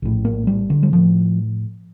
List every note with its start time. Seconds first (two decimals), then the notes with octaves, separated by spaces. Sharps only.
0.02 A#1 A2
0.25 A#3
0.47 G3
0.70 D3
0.83 G3
0.93 A2 F3